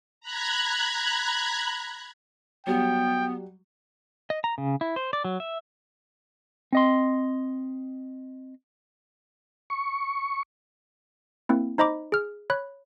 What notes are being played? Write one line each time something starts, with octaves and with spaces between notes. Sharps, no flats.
A#5 B5 F#6 G#6
F#3 G3 B3 G5
D#5
A#5
C#3
E4
C5
D5
F#3
E5
C4 D#5 C6
C#6
A#3 C4 E4
D#4 C5 D#5 A#5 B5 D6
G#4 F6
C#5 B5 F#6